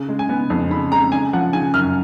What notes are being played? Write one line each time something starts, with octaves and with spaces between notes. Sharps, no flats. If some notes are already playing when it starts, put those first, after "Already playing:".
Already playing: C#3
G#3
G#5
B3
F2
C#3 B5
G#3 A#5
C#3 G#5
F3 F#5
C#3 G#5
F#2 F6